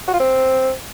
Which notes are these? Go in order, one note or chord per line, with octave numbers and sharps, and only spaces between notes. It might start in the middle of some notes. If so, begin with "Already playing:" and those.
F#4
F4
C4